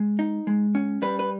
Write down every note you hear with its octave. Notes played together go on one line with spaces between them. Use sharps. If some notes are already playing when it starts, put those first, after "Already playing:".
Already playing: G#3
D#4
G#3
C#4
G3 B4
B4